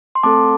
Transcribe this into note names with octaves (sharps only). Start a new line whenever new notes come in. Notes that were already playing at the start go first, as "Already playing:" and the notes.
C6
A3 C4 A4 A5 D6